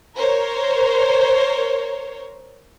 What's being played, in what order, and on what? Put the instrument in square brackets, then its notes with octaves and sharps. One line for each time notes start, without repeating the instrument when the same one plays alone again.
[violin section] A#4 C5 C#5